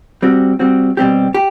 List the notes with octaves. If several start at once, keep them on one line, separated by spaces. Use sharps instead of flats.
G3 C4 F#4
G3 C4 F#4
B2 G3 C4 G4
G4